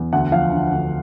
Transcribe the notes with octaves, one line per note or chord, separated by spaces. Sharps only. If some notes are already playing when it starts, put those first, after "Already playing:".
Already playing: E2
D2 F#5
F3 F5
D3
D2